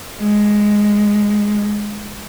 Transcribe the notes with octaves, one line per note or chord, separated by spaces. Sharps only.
G#3